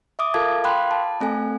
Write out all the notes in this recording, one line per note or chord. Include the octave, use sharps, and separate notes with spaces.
E5 D6 D#6
F4 A4 A#4 F5 A5 G#6
F5 G5 B5 C6 F#6
A5
A3 C4 A4 G#5